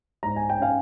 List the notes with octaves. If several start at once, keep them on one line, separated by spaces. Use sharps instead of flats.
G#2 A#5
G#5
G5
C#4 F5 G#5